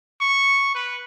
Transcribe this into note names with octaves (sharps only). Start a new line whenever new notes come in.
C#6
B4